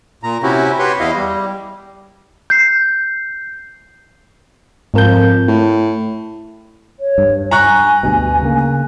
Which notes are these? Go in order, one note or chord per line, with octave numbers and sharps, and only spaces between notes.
A#2 A#5
C3 C#4 E4 F#4 G4
F#4 G4 B4 C#5 C6
E2 E4 D#5 F5
G3
G6 C7
F2 G#2 A#4 G6
A2
C#5
G2
G#5 A#5 C#6 F#6
D2 G2 B2
C#3 A#3